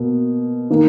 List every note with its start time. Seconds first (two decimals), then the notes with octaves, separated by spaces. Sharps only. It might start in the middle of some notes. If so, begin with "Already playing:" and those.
Already playing: B2 A#3
0.70 D#3 A#3